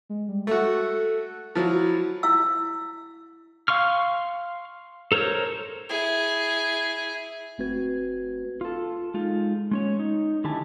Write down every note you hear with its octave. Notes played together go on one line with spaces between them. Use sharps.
G#3
G3
A3 F#4 A4
F3 F#3 E4
E4 F5 E6
F5 C6 C#6 F6
A4 A#4 C5 C#5
E4 G#4
G1 A3 C4 F#4 B4 G#6
F4 A4
G#3 D#4 F4
G#3 C#4 C#5
D#4
D3 D#3 E4 G4 G#5 A5